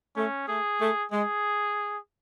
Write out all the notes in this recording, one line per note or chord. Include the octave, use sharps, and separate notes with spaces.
A3 C#4
A3 G#4
A3
G#3 G#4